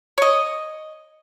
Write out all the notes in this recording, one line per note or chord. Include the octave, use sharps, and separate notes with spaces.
C#5 D#5